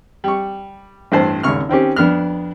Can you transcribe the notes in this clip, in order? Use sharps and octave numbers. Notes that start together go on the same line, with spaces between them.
G3 C#6
A1 G2 C5 A5
G#1 D#2 C#3 C#6 F6
D#3 C4 C#4 G4
F2 B3 D4 F6